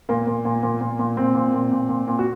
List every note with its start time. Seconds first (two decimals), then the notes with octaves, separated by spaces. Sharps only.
0.09 A#2 A#3
0.27 A#2
0.45 A#2
0.63 A#2
0.81 A#2
0.99 A#2
1.17 A#2 C4
1.35 A#2
1.54 A#2
1.72 A#2
1.89 A#2
2.08 A#2
2.19 F#4